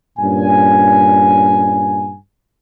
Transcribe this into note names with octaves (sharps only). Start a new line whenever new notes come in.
G2 A#2 C#4 G#5